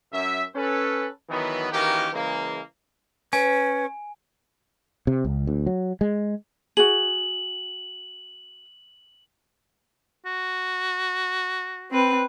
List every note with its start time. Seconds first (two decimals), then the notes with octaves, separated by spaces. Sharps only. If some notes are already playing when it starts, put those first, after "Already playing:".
0.13 F#2 E5
0.55 C#4 A4 B4
1.30 D#3 E3 F#3 B3
1.72 D#3 E3 A#3 C#4 F#4 G4
2.13 C#3 E3 G#3 A#3
3.33 C#4 B4 G#5
5.07 C3
5.25 C#2
5.47 D2
5.67 F#3
6.01 G#3
6.77 F#4 G#4 F#7
10.26 F#4
11.91 C4 B4